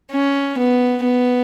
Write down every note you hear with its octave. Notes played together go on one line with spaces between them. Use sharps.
C#4
B3
B3